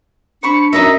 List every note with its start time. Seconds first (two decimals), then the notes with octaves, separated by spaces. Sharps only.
0.43 D4 C5 B5 C#6 C#7
0.73 F#2 D#4 D#5 E5 A#6